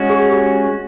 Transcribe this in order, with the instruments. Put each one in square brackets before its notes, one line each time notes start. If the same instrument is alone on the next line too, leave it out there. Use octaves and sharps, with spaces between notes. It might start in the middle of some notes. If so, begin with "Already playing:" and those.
Already playing: [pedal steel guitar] G#3 C#4 F#4
[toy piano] G#4
G4